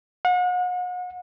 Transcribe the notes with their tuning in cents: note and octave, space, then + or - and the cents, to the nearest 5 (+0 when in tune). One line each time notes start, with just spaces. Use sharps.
F#5 -40